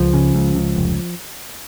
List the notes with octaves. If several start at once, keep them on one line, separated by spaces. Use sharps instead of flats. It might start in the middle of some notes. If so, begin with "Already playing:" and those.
Already playing: C#2 F3
C#3
C#2
C#2
F1